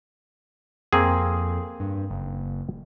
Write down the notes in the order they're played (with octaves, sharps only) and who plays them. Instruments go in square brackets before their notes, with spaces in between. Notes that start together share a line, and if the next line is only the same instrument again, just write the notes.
[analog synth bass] F2 [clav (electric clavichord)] A#3 C4 G#4
[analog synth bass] G2
F#1